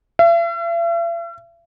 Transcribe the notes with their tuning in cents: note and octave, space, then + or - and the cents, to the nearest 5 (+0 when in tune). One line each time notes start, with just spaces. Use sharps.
E5 +45